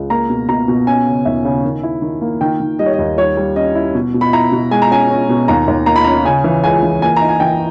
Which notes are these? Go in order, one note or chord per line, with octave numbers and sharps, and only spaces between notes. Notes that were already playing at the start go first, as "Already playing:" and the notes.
Already playing: C#2
A#3 A#5
B2
B2 A#5
B2
C#4 G#5
C#3
D#2 E5
C#3
D#3
E4
D#3
A#3
D#3 G5
D#3
G3 D#5
C#5
D#5
D#2
G3 C#5
G3
C#4 D#5
E4
B2
B2
B5
E4 A#5
B2
G#3 G#5
A#5
C#4 G#5
C#4
B2
D#2 A#5
D#2
A#3 A#5
B5
C#4 A#5
C#3 G#5
E3
C#2 G#5
E3
A#3 G#5
D#4 A#5
G#5
E3 G5